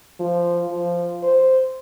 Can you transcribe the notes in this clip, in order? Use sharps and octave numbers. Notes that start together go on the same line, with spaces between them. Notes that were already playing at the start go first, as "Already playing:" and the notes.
F3
F3
C5